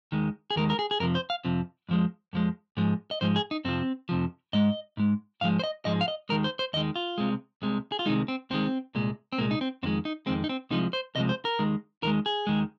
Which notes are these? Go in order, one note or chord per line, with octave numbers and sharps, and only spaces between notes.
D#2 D#3 G#3
G#4
D#2 D#3 G#3 A#4
A#4
G#4
G#4
F2 C3 F3 A#4
C5
F5
F2 C3 F3
F2 F3 G#3
F2 F3 G#3
G#2 F3 G#3
D#5
G#2 F3 G#3 C5
G#4
D#4
F2 C3 F3 C4
F2 C3 F3
G#2 G#3 D#5
G#2 G#3
G#2 F3 G#3 F5
C5
D#5
G#2 F3 G#3 D#5
F5
D#5
D#2 D#3 G#3 A#4
C5
C5
D#2 D#3 G#3 D#5
F4
C2 C3 G#3
C2 C3 G#3
G#4
F4
C2 C3 D#3 G#3 D#4
C4
C2 C3 D#3 G#3 C4
C2 A#2 G#3
C4
C2 A#2 G#3 A#3
D#4
C4
F2 D#3 G#3 C4
D#4
F2 D#3 G#3 C4
D#4
C4
C2 C3 F3 G#3 D#4
C5
C2 C3 F3 G#3 D#5
C5
A#4
D#2 D#3 G#3
D#2 D#3 G#3 A#4
G#4
D#2 D#3 G#3